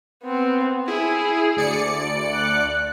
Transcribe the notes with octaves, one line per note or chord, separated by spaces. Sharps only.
B3 C4
E4 G#4
D2 D5 C#7
F#6